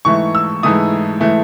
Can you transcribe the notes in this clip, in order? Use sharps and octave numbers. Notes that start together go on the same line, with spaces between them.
G#2 E3 A3 E4 C#6
E6
G#2 E3 A3 E4 D#6
E3 A3 E4